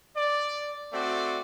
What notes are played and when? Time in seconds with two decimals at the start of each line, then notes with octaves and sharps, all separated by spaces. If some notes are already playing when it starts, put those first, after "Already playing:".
0.15 D5
0.92 A3 C4 F#4 D5